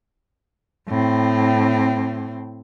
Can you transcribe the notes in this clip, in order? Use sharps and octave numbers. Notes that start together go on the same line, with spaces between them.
A2 C4